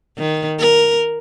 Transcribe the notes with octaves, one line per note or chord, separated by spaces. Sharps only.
D#3
A#4